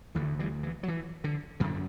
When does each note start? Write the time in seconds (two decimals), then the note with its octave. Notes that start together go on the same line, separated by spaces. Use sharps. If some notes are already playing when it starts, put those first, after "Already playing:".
0.15 D2 D3 E3
0.39 E3 G3
0.63 E3
0.83 F#3
0.88 E3
1.24 D3
1.60 F#2 D3 E3